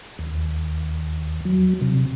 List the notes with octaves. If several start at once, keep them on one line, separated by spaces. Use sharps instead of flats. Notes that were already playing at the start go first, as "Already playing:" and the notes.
D#2
F#3
C3